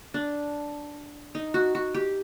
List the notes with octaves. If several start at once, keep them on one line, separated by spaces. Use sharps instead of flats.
D4
D#4
F#4
F#4
G4